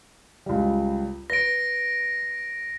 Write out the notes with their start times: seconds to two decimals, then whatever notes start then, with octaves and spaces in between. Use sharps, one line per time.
0.46 C#2 G3
1.30 B4 A#6 D7